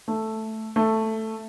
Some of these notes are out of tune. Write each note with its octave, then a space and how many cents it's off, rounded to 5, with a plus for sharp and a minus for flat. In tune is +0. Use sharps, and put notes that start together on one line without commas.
A3 +0
A3 +5